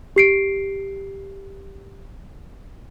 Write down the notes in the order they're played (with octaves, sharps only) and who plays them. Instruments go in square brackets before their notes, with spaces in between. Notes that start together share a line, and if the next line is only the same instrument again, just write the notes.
[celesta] G4 C7 D7